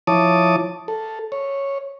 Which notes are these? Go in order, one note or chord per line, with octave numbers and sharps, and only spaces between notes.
F3 E4 C#5 A5 D6 D#6
A4
C#5